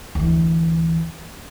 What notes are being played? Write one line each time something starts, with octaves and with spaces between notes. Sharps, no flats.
D2 E3